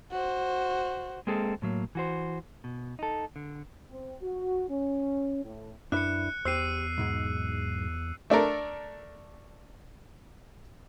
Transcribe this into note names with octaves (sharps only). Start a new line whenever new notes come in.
F#4 C5
G#3 A#3 C4 G#4 A4
A2 F#3 A#3
E3 F#4 C5
B2
D#4 A4
D3
C4
F#4
C#4
A2
F#2 D4 E4 B4 F#6 C#7
E2 G4 C5 E6 C7 D#7
B1 G#2 G#3
A3 D4 A4 A#4